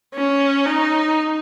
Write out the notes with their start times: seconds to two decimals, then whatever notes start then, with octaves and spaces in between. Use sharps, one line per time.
0.14 C#4
0.66 D#4